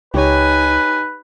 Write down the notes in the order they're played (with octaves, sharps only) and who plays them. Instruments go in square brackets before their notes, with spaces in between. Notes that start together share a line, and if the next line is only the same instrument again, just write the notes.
[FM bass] C#2 [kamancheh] D#4 G#5 [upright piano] G4 C#5 [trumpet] B4